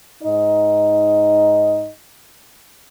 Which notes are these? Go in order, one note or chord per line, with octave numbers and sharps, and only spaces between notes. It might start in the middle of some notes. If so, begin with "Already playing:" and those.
G#2 D#4 D#5